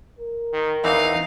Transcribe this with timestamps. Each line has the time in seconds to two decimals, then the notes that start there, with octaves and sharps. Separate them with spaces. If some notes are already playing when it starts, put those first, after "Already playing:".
0.19 A#4
0.53 D#3
0.84 E2 E3 C4 D#4 F5